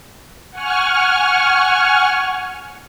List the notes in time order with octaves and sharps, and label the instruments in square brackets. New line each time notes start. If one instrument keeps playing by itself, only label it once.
[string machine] F#5 G#5 C#6 F6